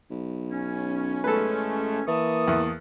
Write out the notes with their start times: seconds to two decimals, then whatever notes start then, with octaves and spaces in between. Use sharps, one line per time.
0.10 B1
0.51 C#4
1.24 A1 G#3 A3 A4 B4
2.08 E3 A#3 A5 C#6 D#6
2.48 E2